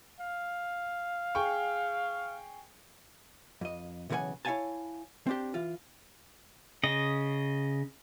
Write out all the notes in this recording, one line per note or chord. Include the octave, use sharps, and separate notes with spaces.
F5
G#4 G5 C#6
F2 D#5
B1 C#3 E3 B4 F#5 G#5
E4 C#5 D#5 F5 G#5 A5
C4 D4 G4
E3 F4
C#3 D#5